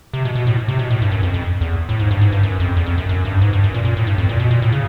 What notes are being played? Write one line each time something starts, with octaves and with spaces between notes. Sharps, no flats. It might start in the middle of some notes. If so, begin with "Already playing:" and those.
C3
B2
B2
A2
C3
B2
A2
G2
F#2
F2
F2
E2
A2
G#2
G2
G#2
G2
F#2
F2
E2
F2
F#2
F#2
G2
G#2
G2
F#2
A#2
A#2
A2
G2
F2
A#2
B2
A#2
A2
C#3